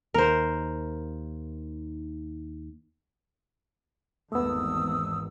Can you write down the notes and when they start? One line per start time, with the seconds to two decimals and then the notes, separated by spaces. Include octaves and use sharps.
0.14 D#2 A#4 C5
4.32 G#1 E2 A3 B3 D#6 E6